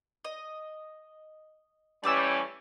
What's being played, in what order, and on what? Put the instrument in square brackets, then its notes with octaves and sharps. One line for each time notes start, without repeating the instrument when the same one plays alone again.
[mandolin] D#5
[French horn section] E3 G3 C#4 [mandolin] A3 D6 E6